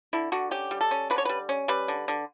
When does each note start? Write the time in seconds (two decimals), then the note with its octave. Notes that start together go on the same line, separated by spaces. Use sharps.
0.13 D3 E4
0.32 D3 F#4
0.51 C#4 G4
0.71 G3
0.81 A4
0.91 C#4
1.10 D3 B4
1.18 C#5
1.25 G3 B4
1.49 C#4
1.68 G3 B4
1.88 D3
2.08 D3